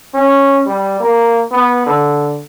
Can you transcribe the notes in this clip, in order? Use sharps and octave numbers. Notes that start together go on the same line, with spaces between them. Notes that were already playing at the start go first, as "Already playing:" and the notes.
C#4
G3
A#3
B3
D3